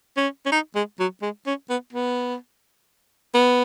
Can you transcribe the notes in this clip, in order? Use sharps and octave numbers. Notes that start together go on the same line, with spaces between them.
C#4
C#4
D#4
G#3
F#3
G#3
C#4
B3
B3
B3